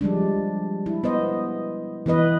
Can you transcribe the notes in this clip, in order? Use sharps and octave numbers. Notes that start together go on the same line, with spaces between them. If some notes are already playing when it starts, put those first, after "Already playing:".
F3 G3 G#3 D4
E4
B3 C5 D#5
E3 B3 B4 D#5